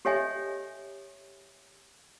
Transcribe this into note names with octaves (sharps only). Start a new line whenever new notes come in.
G4 A4 C#5 D#5 E5 G#5